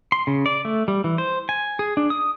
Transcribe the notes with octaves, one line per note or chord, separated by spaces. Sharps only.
C6
C#3
D5
A3
G3
E3
C5
G#5
G#4
D4
D#6